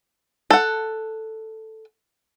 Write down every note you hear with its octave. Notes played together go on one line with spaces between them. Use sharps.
A4 F#5